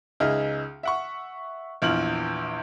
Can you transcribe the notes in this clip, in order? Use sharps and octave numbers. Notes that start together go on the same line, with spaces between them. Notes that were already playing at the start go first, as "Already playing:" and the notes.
C#2 D#4 G#4 E5 F6
E5 F#5 C#6
A#1 E2 F6 F#7